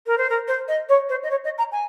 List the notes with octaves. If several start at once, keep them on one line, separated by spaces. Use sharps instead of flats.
A#4
C5
A#4
C5
D#5
C#5
C5
D#5
C#5
D#5
A#5
G#5